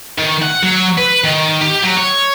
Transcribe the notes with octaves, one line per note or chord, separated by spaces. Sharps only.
D#3
F#5
F#3
B4
D#3
G4
F#3
C#5